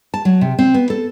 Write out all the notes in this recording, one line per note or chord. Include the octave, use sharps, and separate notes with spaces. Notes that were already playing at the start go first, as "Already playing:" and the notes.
A5
F#3
C3
C4
B3
A4